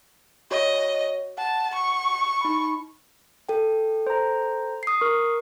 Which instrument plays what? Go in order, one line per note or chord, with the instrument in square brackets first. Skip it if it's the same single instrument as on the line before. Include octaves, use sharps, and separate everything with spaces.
[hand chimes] F#4 C#5 [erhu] D#5
[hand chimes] F#5 [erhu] A5
[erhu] C#6
[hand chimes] D#4 B5
A4 G5
[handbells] C5 A#5
[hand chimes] D#6 C7
[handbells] A#4 C#6